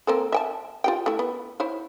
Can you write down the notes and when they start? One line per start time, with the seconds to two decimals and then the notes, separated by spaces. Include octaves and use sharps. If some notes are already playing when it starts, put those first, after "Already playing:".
0.07 A#3 C4 A4
0.32 E5 G5 A5
0.84 F4 G4 G5
1.06 A3 E4
1.19 B3
1.60 E4 C5 C#5